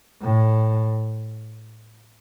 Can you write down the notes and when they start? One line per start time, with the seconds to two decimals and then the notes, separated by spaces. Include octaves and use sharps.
0.23 A2